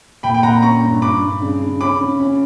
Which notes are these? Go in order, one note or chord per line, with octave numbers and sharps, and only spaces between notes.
A#2 G5 B5
G5
A#2 F#5 A#5
C#4 A#5 C#6
G2
G2 B5 D6
G2
C#3
C#3
C#4 B5 D6
C#3
C#4